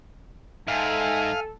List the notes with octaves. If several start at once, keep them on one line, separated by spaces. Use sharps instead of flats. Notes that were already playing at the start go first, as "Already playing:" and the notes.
G#2 A4 E5 F5 G5 G#5